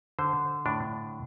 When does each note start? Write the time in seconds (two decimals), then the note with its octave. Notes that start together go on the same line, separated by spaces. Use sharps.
0.19 D3 C5
0.66 A2 D4